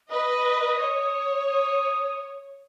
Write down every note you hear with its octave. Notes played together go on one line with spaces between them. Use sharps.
B4 D#5 D#6
C#5
D#6
D#6